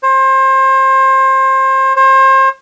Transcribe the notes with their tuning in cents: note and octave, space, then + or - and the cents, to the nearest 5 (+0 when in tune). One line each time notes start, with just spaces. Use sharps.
C5 +30
C5 +35